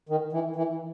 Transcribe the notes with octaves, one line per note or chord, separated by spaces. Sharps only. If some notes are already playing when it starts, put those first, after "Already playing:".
D#3
E3
E3